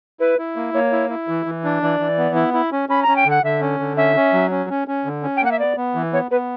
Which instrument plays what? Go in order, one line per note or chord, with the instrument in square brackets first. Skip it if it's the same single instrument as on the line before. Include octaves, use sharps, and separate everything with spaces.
[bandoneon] E4 [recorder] B4
[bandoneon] E4
A#3
[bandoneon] A#3 [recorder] C#5
[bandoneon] E4
E4
E3
E3
D4
[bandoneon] E3 [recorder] D5
[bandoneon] E3
B3
E4
E4
C#4
[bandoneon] C#4 [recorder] B5
[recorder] A#5
[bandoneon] C#4
[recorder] G5
[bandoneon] D3 [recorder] F#5
[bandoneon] D3 [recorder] E5
[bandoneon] C#4
D3
[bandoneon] C#4 [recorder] E5
[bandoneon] C#4
F#3
C#4
C#4
C#4
D3
C#4
[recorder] G5
[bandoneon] A#3 [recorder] F#5
[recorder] E5
[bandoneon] B3 [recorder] D5
[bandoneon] B3
E3
[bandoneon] B3 [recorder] C#5
[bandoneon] B3 [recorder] B4